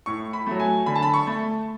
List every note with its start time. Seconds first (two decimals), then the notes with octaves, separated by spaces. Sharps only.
0.06 A2 C#6
0.33 B5
0.47 F#3 A3
0.60 G#5
0.86 D3 B5
0.96 A5
1.03 B5
1.14 C#6
1.27 A3